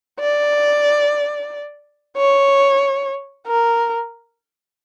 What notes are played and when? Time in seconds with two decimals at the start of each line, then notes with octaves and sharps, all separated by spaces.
0.20 D5
2.17 C#5
3.47 A#4